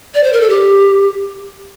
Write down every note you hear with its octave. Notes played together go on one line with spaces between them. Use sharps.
D5
C5
A#4
A4
G4